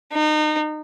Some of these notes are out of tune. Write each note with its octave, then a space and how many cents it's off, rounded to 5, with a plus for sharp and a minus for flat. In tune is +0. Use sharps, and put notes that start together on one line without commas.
D#4 -30